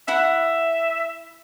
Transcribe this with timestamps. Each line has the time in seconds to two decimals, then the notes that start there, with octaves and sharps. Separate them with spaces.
0.08 E4 E5 F#5 B5